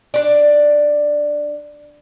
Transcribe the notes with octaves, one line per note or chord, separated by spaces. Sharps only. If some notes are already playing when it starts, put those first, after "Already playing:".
D4 D5